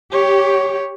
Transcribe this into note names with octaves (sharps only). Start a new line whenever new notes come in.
G4 C#5